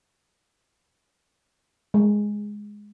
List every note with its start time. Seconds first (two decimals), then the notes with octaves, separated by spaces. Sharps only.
1.94 G#3